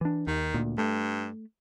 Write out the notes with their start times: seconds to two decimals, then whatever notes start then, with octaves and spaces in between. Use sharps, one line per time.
0.01 E3 D4
0.27 D#2 D#3
0.54 D2 A#2
0.78 G2 A3